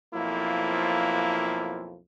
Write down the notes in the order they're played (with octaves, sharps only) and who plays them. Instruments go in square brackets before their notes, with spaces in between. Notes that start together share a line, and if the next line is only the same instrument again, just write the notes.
[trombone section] B1 F2 F3 A#3 E4